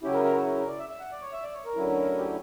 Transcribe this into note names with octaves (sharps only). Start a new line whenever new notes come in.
C#3 F#3 C#4 E4 G4
A#4
A#4
F#4
A#4
A#4
D5
E5
E5
F#5
D5
C#5
E5
D5
C#5
A#4
D2 D3 F#3 C#4 E4
G4